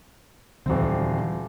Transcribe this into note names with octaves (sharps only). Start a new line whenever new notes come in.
D#1 D3 E3 F#3 C4